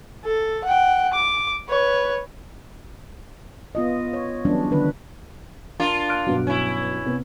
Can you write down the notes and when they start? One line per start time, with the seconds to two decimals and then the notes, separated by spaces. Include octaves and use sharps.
0.25 A4
0.64 F#5 G5
1.13 D6
1.68 B4 C#5
3.75 B3 F4 D#5
4.13 C#5
4.45 E3 F#3 G3 B3 C#4 D4
4.71 D3 D#3 B4
5.80 D4 F4 A#4
6.09 F6 F#6 D7
6.27 G2 B2 F#3
6.47 C#4 E4
7.05 C3 B3